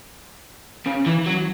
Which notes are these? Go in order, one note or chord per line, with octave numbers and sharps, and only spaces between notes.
C#3
E3
F#3